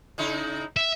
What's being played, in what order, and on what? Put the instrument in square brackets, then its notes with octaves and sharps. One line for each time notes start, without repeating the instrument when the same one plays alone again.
[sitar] C#3 D#4 E4
[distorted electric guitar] E5